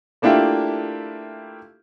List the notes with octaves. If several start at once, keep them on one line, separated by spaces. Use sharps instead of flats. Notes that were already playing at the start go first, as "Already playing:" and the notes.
A3 A#3 D4 E4 F4 G4